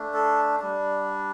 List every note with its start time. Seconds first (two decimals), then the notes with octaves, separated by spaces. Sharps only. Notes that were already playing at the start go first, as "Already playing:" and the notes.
Already playing: A3 D4
0.14 A4
0.60 G3 D4